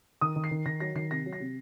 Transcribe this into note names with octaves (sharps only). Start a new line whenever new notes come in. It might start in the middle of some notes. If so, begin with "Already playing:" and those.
D#3 D#6
D#3
C7
D#3
D#3 A#6
F#3 A#6
D#3 C7
C3 A#6
F#3
A#6
C3